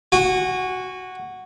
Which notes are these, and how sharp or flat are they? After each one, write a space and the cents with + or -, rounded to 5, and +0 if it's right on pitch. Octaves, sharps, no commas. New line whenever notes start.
F#4 +0 G#5 -30